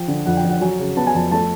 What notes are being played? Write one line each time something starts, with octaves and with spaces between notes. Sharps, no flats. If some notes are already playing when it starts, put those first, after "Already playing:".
Already playing: F3 G5
D3
F2 F#5
G5
F2 F#5
F#3 G#5
C#3
B3 A5
G#5
F2 A5
A3 A5